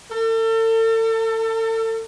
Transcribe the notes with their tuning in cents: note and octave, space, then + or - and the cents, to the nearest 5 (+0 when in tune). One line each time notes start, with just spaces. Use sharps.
A4 +35